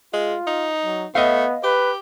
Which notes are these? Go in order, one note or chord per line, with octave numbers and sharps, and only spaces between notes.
G#3 F4
D#4
F#3
A3 B3 D#5 F5
G4 B4